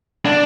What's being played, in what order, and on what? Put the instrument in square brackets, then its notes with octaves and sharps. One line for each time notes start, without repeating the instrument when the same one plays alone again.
[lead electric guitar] D4